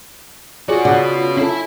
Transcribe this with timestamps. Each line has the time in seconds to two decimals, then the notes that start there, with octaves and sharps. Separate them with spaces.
0.68 B3 F4 F#4 G#4 C#5 D5
0.85 C#3 D5 F#5
1.37 C#4 E4 A4 E5